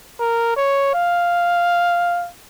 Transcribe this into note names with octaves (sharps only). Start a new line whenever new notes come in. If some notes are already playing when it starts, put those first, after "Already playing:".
A#4
C#5
F5